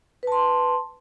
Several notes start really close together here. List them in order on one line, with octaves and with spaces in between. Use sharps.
B4 A5 C6